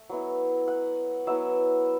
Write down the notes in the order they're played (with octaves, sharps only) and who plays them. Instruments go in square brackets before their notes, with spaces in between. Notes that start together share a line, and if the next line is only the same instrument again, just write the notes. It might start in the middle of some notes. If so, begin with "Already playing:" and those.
Already playing: [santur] A3
F#3 B3 E4
F#5
F#3 B3 E4 E5